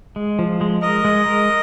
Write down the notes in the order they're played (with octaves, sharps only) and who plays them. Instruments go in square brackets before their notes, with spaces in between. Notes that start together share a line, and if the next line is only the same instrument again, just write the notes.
[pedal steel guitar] G#3
F3
G#3
[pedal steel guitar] A#4 [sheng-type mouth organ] D#5
[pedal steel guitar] G#3
A#4